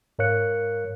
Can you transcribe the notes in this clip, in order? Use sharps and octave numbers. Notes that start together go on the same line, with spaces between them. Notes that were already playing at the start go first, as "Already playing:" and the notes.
G#2 A#4 C#5 F5 F#6 C#7